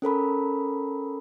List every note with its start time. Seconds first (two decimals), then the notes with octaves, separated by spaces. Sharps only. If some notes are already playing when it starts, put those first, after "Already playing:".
0.02 C#4 A4 A#4 B5